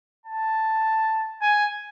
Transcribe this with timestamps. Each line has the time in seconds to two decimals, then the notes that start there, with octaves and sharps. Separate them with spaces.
0.26 A5
1.42 G#5